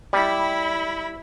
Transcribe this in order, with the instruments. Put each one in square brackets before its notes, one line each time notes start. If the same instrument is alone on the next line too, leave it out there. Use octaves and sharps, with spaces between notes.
[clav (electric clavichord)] G3 [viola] E4 B5